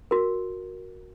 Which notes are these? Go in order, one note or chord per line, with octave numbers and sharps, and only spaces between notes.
F#4 A#4